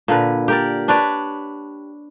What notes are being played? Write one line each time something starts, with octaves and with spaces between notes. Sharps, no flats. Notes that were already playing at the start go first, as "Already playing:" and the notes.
A#2 D3 B4
G4 A#4 D5
D4 B4 C#5 D5